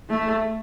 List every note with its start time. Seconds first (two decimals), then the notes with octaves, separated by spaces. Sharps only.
0.10 A3